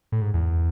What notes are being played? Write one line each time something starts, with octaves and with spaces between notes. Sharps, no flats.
A2
G#2
E2